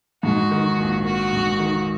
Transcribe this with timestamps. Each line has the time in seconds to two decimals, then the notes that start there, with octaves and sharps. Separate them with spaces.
0.23 G#2 F#4
0.51 D#3
0.78 A#1
1.05 A#3 F#4
1.33 G#2
1.59 D#3